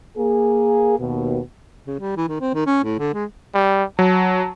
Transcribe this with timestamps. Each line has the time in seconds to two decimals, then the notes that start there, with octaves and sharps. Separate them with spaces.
0.17 A#3 G#4
0.99 D#2 B2
1.87 C#3
2.00 G3
2.17 E3
2.28 D#3
2.40 C4
2.54 D#3
2.66 C#4
2.84 A2
2.99 D3
3.13 G#3
3.54 G3
3.99 F#3 A5